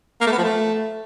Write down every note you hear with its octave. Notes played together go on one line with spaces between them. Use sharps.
A#3
A3
B3
F3
A3